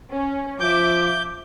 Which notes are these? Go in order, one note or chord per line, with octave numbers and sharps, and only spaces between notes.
C#4
F3 E5 D6 G6